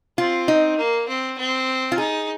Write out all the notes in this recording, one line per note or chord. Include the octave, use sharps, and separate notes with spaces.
C4 F4
D#4
A#3
C4
C4
F4
D#4 G#4